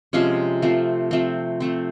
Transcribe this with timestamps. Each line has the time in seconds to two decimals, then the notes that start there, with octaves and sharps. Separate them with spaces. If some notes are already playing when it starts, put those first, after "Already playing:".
0.13 C3 F3 G#3 C#4
0.62 F3 A3 C4
1.11 F3 A3 C4
1.60 F3 A3 C4